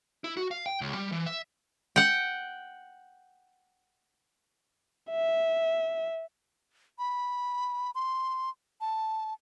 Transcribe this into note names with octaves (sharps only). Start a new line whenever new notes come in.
E4
F#4
F5
G5
C#2
G3
E3
E5
F#5 G5
E5
B5
C6
A5